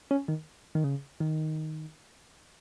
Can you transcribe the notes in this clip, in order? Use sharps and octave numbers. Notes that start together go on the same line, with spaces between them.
C#4
D#3
D#3
C#3
D#3